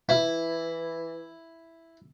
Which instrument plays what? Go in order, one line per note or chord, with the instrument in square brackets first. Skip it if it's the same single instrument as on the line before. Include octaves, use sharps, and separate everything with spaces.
[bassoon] E3 [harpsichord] E4